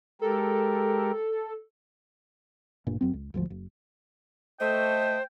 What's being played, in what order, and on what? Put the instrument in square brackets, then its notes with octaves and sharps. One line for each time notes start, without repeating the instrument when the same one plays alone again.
[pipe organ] G#3 G4 A#4 [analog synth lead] A4
[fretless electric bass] A1 G2 A#2
F#1 F#2 C4
C#2
D#1 G#1 D2 F3
F#1
[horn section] A3 D#5 [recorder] C5 [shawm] G5